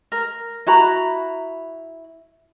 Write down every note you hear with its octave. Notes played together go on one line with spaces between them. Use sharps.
A#4
E4 F#4 A#5 B5